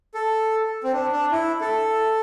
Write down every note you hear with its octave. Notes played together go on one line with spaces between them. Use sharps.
A4
C4
D4
D4
E4
A4